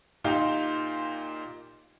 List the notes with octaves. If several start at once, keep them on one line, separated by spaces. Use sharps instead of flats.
A#2 D#4 F4 G4